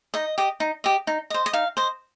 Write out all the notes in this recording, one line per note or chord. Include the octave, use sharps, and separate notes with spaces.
D#4 D#5
G4 D#5
D#4
G4 D#5
D#4
C5 D#5
D#5
D#4 F5
C5 D#5